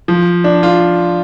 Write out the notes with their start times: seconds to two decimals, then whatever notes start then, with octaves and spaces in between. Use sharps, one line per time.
0.08 F3
0.44 D4
0.63 F4